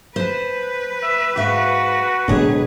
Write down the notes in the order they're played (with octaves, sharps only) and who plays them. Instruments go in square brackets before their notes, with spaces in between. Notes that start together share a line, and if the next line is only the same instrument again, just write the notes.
[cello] B4 [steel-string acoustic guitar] C5 A5
[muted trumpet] E5
[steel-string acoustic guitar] G#2 E5 F5 [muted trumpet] F#4
[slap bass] D1 B2 G#3 [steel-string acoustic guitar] D4 G#4 C#5